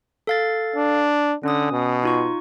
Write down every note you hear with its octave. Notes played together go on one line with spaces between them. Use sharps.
A4 F5 A6
D4
D3 C#4 D#6
B2
D#4 F4 C#6